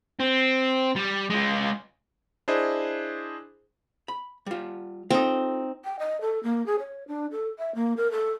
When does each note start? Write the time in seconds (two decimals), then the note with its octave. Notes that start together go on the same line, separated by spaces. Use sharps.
0.20 C4
0.96 G3
1.30 G#3 F4
2.48 D4 E4 G#4 C5 D#5
4.08 B5
4.46 G3 F4
5.10 C4 D#4 F4 A4
5.84 G5
5.99 D#5
6.21 A4
6.43 A#3
6.66 G#4
6.79 C#5
7.08 D4
7.31 A4
7.58 E5
7.75 A#3
7.97 A#4
8.11 A4